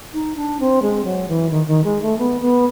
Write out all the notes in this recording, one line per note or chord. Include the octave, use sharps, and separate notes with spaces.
D#4
D4
C4
G#3
F#3
E3
D#3
D#3
G#3
A3
B3
B3